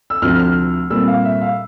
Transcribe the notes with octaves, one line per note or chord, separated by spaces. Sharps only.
E6
D2 C3 F3 C4 F6
F6
A#2 G3 C4 E6
F5
E5
F5